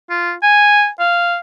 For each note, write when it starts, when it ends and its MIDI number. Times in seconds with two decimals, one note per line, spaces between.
0.10 0.33 65
0.43 0.88 80
1.00 1.37 77